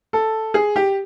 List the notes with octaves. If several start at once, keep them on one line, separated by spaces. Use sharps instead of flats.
A4
G#4
G4